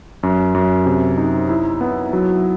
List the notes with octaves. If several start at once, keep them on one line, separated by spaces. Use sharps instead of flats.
F#2
F#2
C3
D#4
E4
B3
F#3